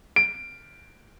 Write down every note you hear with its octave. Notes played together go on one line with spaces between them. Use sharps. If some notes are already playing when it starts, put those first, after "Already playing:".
D7